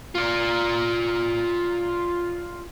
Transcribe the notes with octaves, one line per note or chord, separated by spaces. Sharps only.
F4 D5